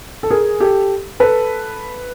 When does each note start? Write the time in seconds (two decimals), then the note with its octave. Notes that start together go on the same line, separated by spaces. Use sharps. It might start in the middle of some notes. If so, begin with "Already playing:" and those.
0.23 A4
0.30 G#4 A#4
0.60 G4 A4
1.20 A4 B4